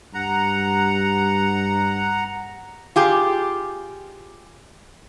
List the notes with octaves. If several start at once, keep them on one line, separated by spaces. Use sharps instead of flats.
G2 F#5 A#5
F4 G4 G#4